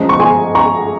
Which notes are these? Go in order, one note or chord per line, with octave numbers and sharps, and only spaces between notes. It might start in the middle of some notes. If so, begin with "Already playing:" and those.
Already playing: F3 G#3 C#4 A#5
C#6
G#5 C6
A#5 C#6